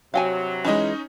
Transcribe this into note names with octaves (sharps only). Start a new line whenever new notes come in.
G2 C3 F#3 F5 G5 G#5
E3 G#3 C#4 D#4 D#5